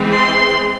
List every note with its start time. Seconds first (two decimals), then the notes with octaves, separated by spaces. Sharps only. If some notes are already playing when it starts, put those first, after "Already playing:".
Already playing: E3 G#3 C4
0.13 C6